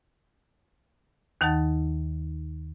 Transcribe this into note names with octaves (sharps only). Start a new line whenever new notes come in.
D#2 D#3 D#4 F#5 A5 A6